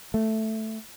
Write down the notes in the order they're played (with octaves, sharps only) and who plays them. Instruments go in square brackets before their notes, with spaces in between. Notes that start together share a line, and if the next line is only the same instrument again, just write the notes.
[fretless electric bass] A3